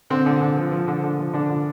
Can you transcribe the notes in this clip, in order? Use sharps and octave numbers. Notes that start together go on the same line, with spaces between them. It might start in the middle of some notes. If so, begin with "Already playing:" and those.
D3 C4
D3
D3
F3
F3
D3
D3
F3
D3 D4
D3